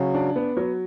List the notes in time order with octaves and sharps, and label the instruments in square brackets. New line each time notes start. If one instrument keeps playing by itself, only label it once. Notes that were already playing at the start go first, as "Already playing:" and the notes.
Already playing: [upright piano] C#3 [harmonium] F#3
[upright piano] D4
B3
F#3